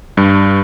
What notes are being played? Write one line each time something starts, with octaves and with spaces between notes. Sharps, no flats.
G2